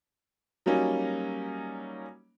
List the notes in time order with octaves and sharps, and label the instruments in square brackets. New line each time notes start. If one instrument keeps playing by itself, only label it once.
[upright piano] F#3 G3 A#3 C#4 D#4